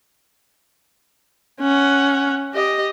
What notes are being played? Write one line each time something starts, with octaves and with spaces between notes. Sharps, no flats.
C#4 F#5
G4 D#5